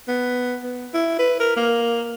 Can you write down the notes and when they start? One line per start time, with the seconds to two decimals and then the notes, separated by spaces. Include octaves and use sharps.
0.08 B3
0.63 B3
0.94 E4
1.19 B4
1.40 A#4
1.56 A#3